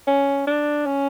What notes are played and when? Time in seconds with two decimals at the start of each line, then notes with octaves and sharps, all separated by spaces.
0.07 C#4
0.47 D4
0.86 C#4